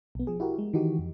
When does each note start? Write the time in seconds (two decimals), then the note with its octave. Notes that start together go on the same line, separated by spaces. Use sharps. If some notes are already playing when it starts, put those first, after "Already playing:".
0.15 B1 B3
0.27 F3 G#4
0.40 E4 F#4 G4 A#4
0.58 G#3
0.73 D#3 E3 D#4 F#4 G4
0.99 F2